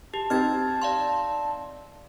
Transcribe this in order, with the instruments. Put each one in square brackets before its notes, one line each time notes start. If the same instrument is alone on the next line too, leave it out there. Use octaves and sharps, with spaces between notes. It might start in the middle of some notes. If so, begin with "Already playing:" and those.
[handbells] G4 [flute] A5
[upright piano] C4 D#4 G4 [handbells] F6 G#6 A6
[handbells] D5 F5 C6